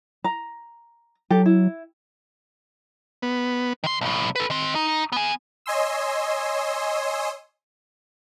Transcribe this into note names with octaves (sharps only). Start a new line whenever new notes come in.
A#5
F#3 G4 A4
E4
B3
D#3 C6
B1 A2
A4 B4
D#3 C4
D#4
B3 G#5
C#5 D#5 G#5 C6 E6